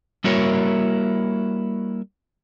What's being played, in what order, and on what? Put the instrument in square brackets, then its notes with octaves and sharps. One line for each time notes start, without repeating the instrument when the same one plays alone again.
[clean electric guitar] G3 A#3 E4 F#4 A#4 C#5